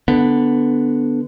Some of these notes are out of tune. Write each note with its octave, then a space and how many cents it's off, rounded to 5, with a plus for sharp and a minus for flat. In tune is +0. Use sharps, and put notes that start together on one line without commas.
D3 +0 B3 +0